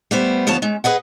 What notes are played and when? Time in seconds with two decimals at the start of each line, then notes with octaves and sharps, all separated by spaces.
0.11 G3 A3 B3 B4 C5
0.47 D2 F3 B3 C#5 A5
0.62 G#3 C#4
0.84 G#4 B4 D#5 F#5